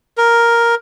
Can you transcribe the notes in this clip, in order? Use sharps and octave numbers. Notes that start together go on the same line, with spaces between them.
A#4